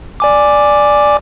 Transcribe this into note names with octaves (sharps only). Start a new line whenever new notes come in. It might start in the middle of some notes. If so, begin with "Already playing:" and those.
D5 G#5 D6